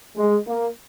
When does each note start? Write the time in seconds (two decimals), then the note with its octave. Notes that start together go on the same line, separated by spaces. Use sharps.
0.16 G#3
0.46 A#3